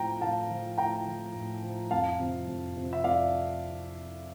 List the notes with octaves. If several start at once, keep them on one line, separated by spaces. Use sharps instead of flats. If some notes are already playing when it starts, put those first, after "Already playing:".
Already playing: A2 F3 G5 A#5
A2 F5 A5
F3
A2 G5 A#5
F3
A2
F3
F2 F5 A5
C3 F3
F2
C3 F3
E5
F2 D5 F5